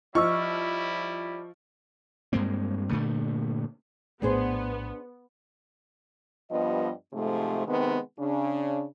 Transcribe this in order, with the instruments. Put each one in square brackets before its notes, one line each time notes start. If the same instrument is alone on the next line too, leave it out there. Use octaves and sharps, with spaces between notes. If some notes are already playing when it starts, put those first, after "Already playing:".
[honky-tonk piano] F3 C#6 F6 [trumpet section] G3 E4 [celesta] D#5 E6
[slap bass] G2 G#3 A#3 C4
G2 A#2 D3 A3
[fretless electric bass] A#1 A2 A3 [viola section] B3 [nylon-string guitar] D4 G#4 C5
[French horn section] G2 F3 G3 B3 D#5
G#2 C3 F3 A3
C3 D#3 G#3 B3 C4 B4
C#3 D4